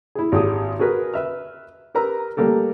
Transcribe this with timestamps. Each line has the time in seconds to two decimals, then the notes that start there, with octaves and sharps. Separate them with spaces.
0.15 E4 G#4
0.32 G#1 G4 G#4 D#6
0.79 F#4 G#4 A#4 B4
1.14 B4 E5 F6
1.95 G4 A#4 B4 A#5 E6
2.37 G3 A3 A#3 G4 A4